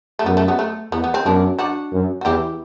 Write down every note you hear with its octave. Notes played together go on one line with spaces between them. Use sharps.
A3
F#2 B3
A3
B3
A3
E2 B3
B3
C4
F#2 B3 D4
D4 F#4
F#2
F#4
E2 E4 G4